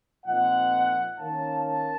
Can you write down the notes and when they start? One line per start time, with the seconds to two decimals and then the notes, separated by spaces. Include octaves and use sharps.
0.25 A#2 F3 C4 D#4 F#5
1.18 D#3 A#3 C#4 A5
1.65 A5